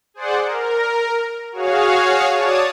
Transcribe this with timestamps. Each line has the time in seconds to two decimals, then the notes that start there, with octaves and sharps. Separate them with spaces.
0.14 G#4 C5 D5 F#5
0.45 A#4
1.52 F#4 G#4 C#5 F5
2.35 C#5 D5 A5 D#6